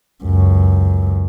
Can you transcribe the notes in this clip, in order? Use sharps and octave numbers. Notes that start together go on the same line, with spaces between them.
C#2 F#2